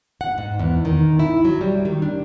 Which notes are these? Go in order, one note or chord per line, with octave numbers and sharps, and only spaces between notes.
F#5
G#2
E2
D#3
E4
F#3
G3
D#3
D4